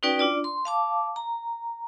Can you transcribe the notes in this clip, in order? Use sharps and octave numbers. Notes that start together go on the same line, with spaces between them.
C#4 D#4 F#4 B4 D5 G5
D4 F4 D5
C6
F5 A5 D6
A#5